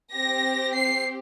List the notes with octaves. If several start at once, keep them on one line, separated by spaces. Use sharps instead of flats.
C4 G4 A#6
C7